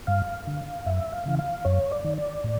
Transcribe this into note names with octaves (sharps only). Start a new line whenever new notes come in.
G2 F5
D3
F#2 E5
F5
C#3 E3
F5
F#2 C#5
D5
D#3
D5
A2